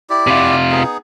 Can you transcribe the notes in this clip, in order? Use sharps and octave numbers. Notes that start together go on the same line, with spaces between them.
E4 G4 D5
C3 F4
B3 D#4 G#4